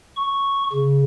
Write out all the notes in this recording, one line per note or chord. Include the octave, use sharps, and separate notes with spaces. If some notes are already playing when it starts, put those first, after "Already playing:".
C#6
C#3